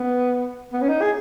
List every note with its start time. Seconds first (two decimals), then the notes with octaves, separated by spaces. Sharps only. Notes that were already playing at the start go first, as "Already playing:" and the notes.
Already playing: B3
0.73 B3
0.82 C#4
0.89 D#4
1.02 G#4